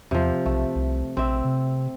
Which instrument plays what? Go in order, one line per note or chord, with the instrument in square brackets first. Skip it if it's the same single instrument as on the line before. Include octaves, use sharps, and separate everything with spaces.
[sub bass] E2 [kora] C3 F3
[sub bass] B1 [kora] A3
[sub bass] C2
[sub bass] A#1 [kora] C4 E5
[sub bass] C3